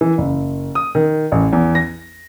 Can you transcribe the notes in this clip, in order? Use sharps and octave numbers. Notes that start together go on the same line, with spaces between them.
E3
F#1
D#6
D#3
A1
E2
A#6